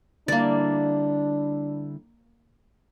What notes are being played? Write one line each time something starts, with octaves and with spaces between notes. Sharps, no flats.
D3 G3 A#3 D4 E4 D5